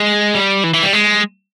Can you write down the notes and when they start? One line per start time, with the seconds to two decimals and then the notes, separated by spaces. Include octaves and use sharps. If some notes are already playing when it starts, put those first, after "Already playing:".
Already playing: G#3
0.35 G3
0.64 E3
0.74 E3
0.83 G3
0.93 G#3